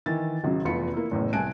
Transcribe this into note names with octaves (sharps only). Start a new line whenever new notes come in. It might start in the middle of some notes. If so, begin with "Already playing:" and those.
D#3 E3 A6
G#1 C#3 F#3
F1 E2 F4 B5 C#7
A#3 E4
F#1 E2 A2
C2 G#5 A5 F#6 D7